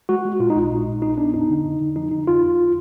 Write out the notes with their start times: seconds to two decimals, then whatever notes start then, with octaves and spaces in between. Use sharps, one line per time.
0.09 G#3 F#4
0.25 G#3
0.40 A#2 F4
0.50 D#4
0.56 A#1
0.71 A#2
0.87 A#2
1.02 A#1 D#4
1.18 B3 D4
1.34 F2 D#4
1.50 D3
1.65 F2
1.81 D3
1.96 F3 D#4
2.12 D3 D#4
2.27 F2 F4
2.43 F2